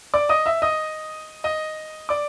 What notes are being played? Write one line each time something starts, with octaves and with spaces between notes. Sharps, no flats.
D5 D6
D#5 D#6
E5 E6
D#5 D#6
D#5 D#6
D5 D6